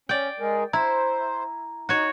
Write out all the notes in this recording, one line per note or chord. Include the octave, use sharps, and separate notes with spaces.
C#4 D5 G5
G#3 G#4 A#4
E4 C5 A#5
D#4 F#4 C#5